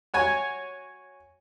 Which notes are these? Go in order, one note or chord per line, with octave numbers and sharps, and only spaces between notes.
F#4 C#5 G#5